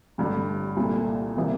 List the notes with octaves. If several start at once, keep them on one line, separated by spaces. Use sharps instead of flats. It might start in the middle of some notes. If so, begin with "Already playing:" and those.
A1 G2 D3 G3
C2 A#2 A3
C3 E3 G3 A#3